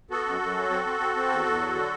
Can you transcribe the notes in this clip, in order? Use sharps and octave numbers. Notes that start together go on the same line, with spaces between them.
B3 F#4 A4
F#2
F#2
F#3
C4
C4
C4
C4
E2
E2
F#3
D3